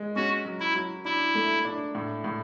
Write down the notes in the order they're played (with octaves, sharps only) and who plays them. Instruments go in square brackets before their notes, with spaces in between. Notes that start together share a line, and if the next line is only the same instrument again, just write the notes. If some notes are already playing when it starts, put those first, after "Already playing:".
Already playing: [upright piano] G#3
[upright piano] C#4 [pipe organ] F#4
[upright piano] F#3
[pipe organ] E4
[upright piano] F#3
[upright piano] D4 [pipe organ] E4
[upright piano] A3
D4
A2
A2